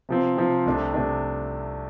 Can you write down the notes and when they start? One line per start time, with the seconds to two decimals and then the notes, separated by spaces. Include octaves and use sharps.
0.09 C3 F3 C4
0.37 C3 F3 C4
0.66 C2 C3 A3 D4
0.94 C3 A3 D4